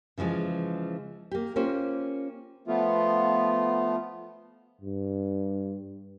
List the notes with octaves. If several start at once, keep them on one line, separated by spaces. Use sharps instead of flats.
C#3 E3 F3 G#3
A#3 G4
A#3 C#4 F4 G4 C5
F3 A3 B3 F4
G2